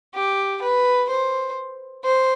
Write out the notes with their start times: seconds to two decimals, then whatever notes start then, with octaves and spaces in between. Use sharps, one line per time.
0.14 G4
0.62 B4
1.09 C5
2.04 C5